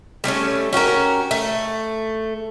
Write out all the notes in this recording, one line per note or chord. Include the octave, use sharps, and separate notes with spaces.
G3 A3 B3 C#4
C#4 F#4 G4 A#4
A3